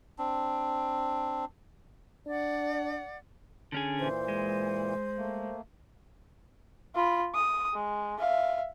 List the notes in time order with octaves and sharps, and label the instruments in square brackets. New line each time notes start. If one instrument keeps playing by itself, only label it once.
[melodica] C4 D4
[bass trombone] D4 [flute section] D5 F#5
[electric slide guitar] D3 C#4 G#4
[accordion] A#2 E3 [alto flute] C5
[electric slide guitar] G#3
[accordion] A3 A#3
[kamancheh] F4 B5
D#6
G#3
E5 F5